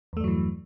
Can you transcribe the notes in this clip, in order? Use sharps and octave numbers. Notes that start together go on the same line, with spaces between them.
E2 G2 E3 F#3 A3